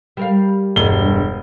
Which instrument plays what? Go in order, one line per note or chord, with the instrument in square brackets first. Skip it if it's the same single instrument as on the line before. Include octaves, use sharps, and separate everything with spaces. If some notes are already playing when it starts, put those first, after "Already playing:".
[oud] G3 A#4 F5
[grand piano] E1 G7 [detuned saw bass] G2